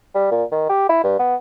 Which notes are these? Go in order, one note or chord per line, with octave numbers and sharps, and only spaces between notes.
G3
A#2
D#3
G4
E4
G2
B3